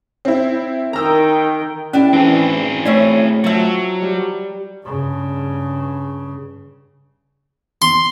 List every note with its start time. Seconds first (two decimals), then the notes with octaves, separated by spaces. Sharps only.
0.25 C4 E4
0.93 D#3 G5 A#5 E6
1.93 C#4 D4 E4 G4
2.13 E3 C4 G#4 A5
2.86 A2 E3 C#4 D5 E5
3.44 F3 F#3 E5
4.02 G3
4.86 G2 C#3
7.82 C6